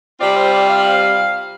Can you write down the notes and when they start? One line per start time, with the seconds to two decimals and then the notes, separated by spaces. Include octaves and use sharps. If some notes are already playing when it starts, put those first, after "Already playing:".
0.20 C3 G3 C4 F4 D5
0.37 C5
0.52 D5
0.69 F5